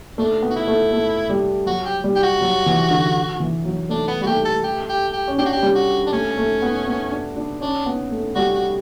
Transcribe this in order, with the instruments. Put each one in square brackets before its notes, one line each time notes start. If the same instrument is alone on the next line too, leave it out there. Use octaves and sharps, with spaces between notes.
[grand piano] A3 [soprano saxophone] D4
[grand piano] B3
[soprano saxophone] F#4
E4
[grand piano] A3
A3
G3
[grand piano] F#3 [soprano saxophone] F#4
[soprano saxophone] G4
[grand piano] G3
[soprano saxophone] G4
F#4
[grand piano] F#3
E3
D3
E3
F#3
[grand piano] A3 [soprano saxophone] D4
[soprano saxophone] B3
[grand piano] G3 [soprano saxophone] F#4
[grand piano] A3 [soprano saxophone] G4
[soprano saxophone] A4
G4
G4
G4
[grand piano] C#4
[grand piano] D4 [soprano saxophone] G4
[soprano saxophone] F#4
G4
[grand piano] G3
[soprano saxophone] F#4
D4
[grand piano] A3 [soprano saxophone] C#4
[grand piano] A3
B3
B3
D4
D4
[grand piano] C#4 [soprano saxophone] D4
[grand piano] B3
A3
[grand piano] G3 [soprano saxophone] F#4
[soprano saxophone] F#4